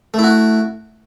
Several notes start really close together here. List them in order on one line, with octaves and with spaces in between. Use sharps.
A3 E4 F#4